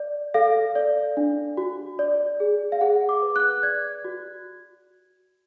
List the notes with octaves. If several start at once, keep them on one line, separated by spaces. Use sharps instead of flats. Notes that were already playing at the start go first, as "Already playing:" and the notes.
Already playing: D5
A4 F5
D5
D4
F#4
D5
G#4
F5
G#4 F#5
D6
B4
F#6
D5 G#6
F#4